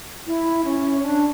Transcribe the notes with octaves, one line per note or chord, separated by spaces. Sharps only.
E4
C#4
D4